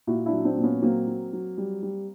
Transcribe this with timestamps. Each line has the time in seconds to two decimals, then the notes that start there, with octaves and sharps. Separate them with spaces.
0.07 A#2 E4 F#4
0.26 D4 E4
0.32 F#3
0.45 C4 D4
0.57 A#2
0.63 B3 C#4
0.82 F#3 A#3 C4
1.07 F#3
1.33 F#3
1.58 G3
1.83 G3